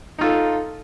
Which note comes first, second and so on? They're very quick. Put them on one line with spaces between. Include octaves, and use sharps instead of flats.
D#4 F4 A4